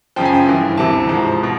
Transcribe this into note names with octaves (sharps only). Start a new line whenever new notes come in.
F#2 C#3 F3 G5
G#5
G5
G2 E3
D2 C3 E3 A5
G#2 F3
B2